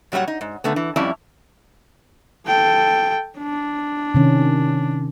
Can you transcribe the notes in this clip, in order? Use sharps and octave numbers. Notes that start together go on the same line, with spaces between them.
A#2 F#3 G3 C#5 F#5
D#4
G#2
A#2 D3 A3 B3
E3
F2 G3 C#4 E4 D5 A5
A4 G5
D4
C3 D#3 C#4